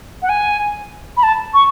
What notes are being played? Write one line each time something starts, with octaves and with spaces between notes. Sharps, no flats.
F#5
G#5
B5
A5
C#6